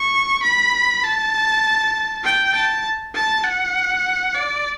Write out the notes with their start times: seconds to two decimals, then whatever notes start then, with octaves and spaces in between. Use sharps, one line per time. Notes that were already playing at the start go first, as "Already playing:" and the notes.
Already playing: C#6
0.43 B5
1.03 A5
2.25 G5
2.54 A5
3.15 A5
3.44 F#5
4.35 D5